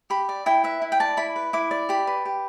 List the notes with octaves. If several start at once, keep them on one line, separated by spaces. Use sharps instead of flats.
G4 B5
D5
E4 G5
B4 E5
E4
G5
D5 A5
E4 B5
B4
E4 D6
D5
G4 B5
B4
G4